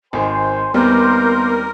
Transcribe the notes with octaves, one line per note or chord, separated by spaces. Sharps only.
G#1 D#3 C5 G#5 C6
D#2 G3 B3 C4 A#4 C6 D6 G6